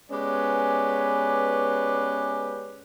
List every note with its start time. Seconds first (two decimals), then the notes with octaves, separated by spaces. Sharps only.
0.11 G#3 B3 C#4 G4 B4 D5